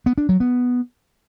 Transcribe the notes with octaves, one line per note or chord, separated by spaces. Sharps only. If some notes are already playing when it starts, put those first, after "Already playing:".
B3
D4
F#3
B3